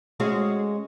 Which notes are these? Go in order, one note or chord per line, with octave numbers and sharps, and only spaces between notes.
G#3 C#4 F#4